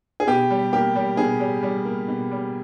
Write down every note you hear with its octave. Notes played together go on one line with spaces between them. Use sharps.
G#4
B2 G4
G3
A#3 G4
G3
B2 G#4
G3
G3
A#3
B2
G3